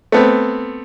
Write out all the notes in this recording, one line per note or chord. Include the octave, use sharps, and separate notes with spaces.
A3 B3 C4